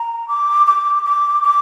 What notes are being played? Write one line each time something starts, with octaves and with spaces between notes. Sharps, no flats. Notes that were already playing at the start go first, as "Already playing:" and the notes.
Already playing: A#5
D6
D6
D6
D6